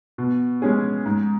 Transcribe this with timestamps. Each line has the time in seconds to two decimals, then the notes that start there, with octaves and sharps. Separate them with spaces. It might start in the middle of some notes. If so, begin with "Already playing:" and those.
0.18 B2
0.62 G#3 C#4 G#4
1.06 G#2